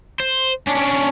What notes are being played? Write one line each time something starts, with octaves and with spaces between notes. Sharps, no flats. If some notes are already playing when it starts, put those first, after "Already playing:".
C5
C#4 D4